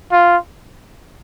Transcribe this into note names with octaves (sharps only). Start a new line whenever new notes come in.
F4